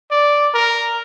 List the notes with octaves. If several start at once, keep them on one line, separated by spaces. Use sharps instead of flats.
D5
A#4